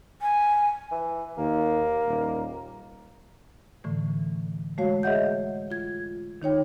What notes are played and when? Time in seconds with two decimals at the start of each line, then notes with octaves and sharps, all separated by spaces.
0.22 G#5
0.92 E3
1.38 D#2 A#3
2.07 D#1
3.84 A2 D3 E3 A3
4.78 G#3 A3 F#4 C#5 F5
5.03 G#4 C#5 D#5 E5 F#5 G6
5.70 F4 G#6
6.42 D#3 D#4 C#5 G5